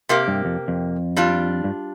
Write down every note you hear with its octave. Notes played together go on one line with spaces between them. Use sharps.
C3 A#3 G4
G2
F2
F2
G3 D4 F4
G2